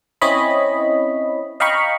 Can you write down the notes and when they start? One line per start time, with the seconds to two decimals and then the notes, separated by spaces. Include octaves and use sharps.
0.21 C4 C#4 E4 C#5 D#5 B5
1.60 D#5 F5 G5 A#5 B5 C#6